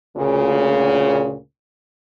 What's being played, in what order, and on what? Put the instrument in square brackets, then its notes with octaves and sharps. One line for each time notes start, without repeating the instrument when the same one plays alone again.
[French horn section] D2 A#2 C#3